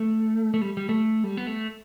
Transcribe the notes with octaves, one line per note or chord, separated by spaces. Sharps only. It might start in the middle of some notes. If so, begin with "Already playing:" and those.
Already playing: A3
A3
G3
G3
A3
G3
B3
A3